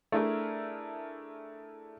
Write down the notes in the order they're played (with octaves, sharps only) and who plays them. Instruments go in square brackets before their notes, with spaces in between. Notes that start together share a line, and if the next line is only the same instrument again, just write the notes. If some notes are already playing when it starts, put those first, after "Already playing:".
[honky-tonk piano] A3 D4 E4 G#4 A#4